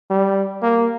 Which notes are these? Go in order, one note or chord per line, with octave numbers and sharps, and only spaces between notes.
G3
A#3